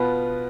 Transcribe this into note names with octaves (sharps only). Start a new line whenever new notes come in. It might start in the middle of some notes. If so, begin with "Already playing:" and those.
Already playing: B2 B3 F4 B4